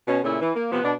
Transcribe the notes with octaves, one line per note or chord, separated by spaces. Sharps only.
B2 C#4
A#2 C#3 A3 C#4 E4
E3
A#3
C3 F3 B3
B2 D4